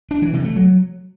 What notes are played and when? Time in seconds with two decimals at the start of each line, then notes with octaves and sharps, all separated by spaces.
0.11 D4
0.22 E3
0.33 C3
0.45 A3
0.56 F#3